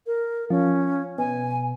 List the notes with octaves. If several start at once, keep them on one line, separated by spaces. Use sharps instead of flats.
A#4
F3 C#4
B2 G#5